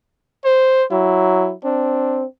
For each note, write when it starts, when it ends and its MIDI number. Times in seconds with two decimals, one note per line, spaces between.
0.45 0.84 72
0.91 1.53 54
0.91 1.54 64
1.64 2.25 60
1.64 2.25 62